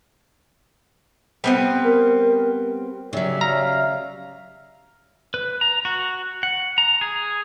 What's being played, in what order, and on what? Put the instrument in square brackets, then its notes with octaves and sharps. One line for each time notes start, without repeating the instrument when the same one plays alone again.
[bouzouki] G3 B3 C4
[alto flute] A#4
[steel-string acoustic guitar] C#3 F#3 [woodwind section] G4 D5 E5
[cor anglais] F5 [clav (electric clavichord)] A#5
[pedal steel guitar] B4
A#5
F#4
F#5
A#5
G#4